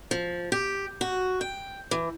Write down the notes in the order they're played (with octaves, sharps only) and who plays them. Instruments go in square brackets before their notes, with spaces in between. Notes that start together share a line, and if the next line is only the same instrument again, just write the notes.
[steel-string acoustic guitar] F3
G4
F#4
G5
E3